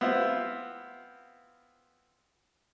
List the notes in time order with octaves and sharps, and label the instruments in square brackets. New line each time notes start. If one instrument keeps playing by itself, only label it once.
[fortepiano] B3 C4 E4 F4